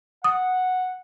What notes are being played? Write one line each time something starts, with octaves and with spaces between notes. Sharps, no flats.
F#5 D#6